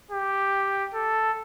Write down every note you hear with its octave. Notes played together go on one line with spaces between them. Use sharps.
G4
A4